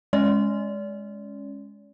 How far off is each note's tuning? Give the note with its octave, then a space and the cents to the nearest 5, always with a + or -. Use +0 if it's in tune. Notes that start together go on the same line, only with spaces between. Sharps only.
G#3 +0 C#4 +0 D5 -35